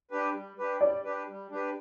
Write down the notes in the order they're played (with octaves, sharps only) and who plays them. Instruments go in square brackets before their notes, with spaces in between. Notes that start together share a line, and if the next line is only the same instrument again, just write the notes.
[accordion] D4 G4 B4
G3
D4 G4 B4
[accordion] G3 [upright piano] D5
[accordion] D4 G4 B4
G3
D4 G4 B4